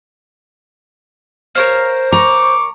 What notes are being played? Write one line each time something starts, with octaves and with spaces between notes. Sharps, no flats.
A#4 C5 C#5 F5
A#5 C#6 D6